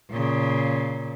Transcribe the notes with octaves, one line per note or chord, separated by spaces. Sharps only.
A#2 C#3